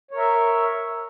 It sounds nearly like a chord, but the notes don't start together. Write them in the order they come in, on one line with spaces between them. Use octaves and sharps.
C#5 A#4 E5